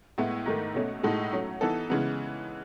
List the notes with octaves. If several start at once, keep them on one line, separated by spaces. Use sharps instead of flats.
A2 G#3 B3 E4
G#2 D#3 A3
B2 A3 C#4
A2 G#3 D#4 F#4 A4
F#3 A3 C#4
E3 B3 D#4 A4
C#3 E3 G#3 B3